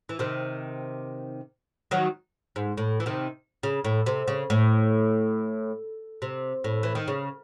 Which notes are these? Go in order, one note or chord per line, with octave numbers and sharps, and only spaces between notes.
E3
C3 D#3
D#3 F#3
G#2
A2
E3
C3 D#3
C#3
A2
C3
C#3
A2
C3
A2
E3
D#3
C#3